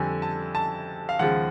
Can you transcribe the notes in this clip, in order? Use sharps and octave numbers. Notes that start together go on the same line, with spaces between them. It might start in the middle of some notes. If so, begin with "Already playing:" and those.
Already playing: F2 D3 G3 G#5
A5
A5
F5
D#2 C#3 F3 G#3 F#5